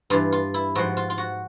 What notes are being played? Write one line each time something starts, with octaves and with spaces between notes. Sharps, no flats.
G2 E3 F4
F4
E4
G#2 F3 F#4
F4
F4
F#4